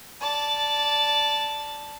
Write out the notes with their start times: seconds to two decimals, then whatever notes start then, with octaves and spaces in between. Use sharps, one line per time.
0.21 D5 A5